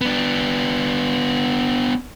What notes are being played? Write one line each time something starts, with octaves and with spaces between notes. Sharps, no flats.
B3 D4